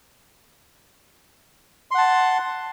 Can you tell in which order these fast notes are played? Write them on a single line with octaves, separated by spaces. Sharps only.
C6 F#5 A5